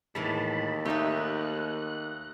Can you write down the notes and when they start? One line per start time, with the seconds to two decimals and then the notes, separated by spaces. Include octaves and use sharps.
0.15 D#2 A2 E3 G#3 A5 B5
0.85 A3 D#4 G4 E5 F#6